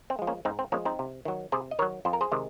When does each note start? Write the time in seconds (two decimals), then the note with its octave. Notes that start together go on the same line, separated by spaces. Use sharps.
0.10 C4
0.19 F3 G#3
0.27 A#3 C#4
0.45 G#2 C4 D#4
0.59 C4
0.72 F3 G#3 A#3 C#4
0.85 C4 D#4
0.99 C3
1.25 D#3 F#3
1.52 C3 G#4 C5
1.71 D#5
1.79 D#3 A#4 C#5
1.82 F#3
2.05 F2 C5
2.13 A#4
2.21 G#4 C5
2.32 C3 D#3 G#3